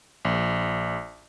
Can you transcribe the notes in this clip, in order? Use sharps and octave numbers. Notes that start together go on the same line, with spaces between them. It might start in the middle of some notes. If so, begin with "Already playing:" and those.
A#1